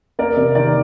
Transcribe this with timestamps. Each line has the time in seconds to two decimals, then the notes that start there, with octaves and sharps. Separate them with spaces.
0.19 A#3 A#4 D5
0.37 C3
0.55 D#3 A#4 D5